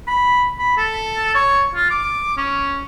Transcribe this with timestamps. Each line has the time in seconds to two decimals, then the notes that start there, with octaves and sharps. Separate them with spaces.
0.07 B5
0.59 B5
0.77 A4
1.35 C#5
1.75 F4
1.90 D6
2.37 C#4